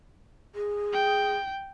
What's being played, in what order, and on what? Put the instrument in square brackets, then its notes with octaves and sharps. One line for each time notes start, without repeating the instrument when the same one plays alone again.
[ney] G#4
[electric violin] G5